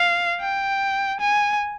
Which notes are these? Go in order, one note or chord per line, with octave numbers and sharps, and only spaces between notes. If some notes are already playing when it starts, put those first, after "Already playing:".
Already playing: F5
G5
G#5